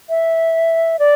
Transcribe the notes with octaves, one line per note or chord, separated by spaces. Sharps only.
E5
D5